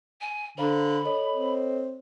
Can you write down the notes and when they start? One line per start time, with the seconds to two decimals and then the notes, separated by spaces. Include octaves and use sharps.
0.21 G#5
0.58 D3 C5 F5 A#5 B5
1.05 A4 C#5 D#5
1.33 C4